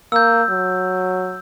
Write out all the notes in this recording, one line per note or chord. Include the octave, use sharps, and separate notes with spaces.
A#3 E6 G6
F#3